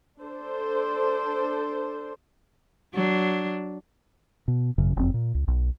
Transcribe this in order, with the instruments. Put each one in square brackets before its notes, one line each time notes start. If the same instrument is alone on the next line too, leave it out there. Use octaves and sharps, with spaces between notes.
[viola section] D4 A4 C5
[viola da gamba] F#3 D4
[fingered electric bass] B2
G#1 F#2 C#3
F#1 F2 C4
A#2
C#2
B1